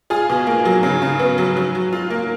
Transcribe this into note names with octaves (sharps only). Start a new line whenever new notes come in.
F4 G#4
B2
A#3
F#3
C#3
C#3
B3
F#3
F#3
F#3
F4
A#3